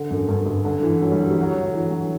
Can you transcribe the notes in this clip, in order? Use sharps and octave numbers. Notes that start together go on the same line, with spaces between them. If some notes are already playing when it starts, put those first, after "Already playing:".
Already playing: D3
F#2
G2
G2
D3
E3
F#3
G3
F#3
G3
F#3
D3
E3
F#3